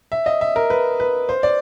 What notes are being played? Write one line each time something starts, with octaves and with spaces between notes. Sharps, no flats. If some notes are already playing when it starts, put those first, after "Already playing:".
E5
D#5
E5
A#4
B4
B4
C5
D5